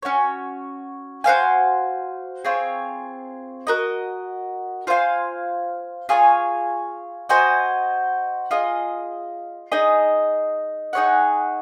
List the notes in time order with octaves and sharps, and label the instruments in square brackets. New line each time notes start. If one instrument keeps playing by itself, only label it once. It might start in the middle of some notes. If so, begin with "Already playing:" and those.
[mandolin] C#4 F#4 C#5
F#4 C5 F5 G#5
C4 F4 G#4 C#5
F#4 A#4 D#5
F4 C5 F5 G#5
F4 G#4 C#5 G#5
F#4 C5 D#5 G#5
F4 G#4 D#5
D#4 G#4 D#5
D#4 G#4 C#5 F#5